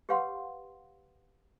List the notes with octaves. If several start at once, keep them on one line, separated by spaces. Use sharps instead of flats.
G4 B4 C#5 F5 F#5 C6